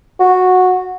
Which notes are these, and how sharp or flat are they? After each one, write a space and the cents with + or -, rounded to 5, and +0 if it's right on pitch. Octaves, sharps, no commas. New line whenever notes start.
F#4 -10